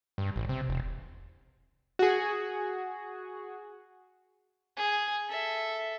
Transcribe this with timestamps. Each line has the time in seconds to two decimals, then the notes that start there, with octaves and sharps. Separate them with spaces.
0.18 G2
0.36 A1
0.49 C3
0.69 E1
1.99 F#4 G#4
4.76 G#4
5.29 A4 E5